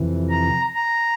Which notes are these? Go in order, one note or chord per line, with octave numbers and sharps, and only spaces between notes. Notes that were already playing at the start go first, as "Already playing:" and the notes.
Already playing: F2 C3 E3
A#5
A#5